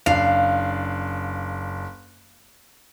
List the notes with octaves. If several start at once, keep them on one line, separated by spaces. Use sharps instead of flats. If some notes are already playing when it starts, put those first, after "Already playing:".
F#1 D4 F5